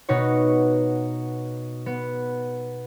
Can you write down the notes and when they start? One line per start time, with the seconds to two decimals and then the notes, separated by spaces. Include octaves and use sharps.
0.09 B2 D#4 F#4 B4 C#5
1.86 B3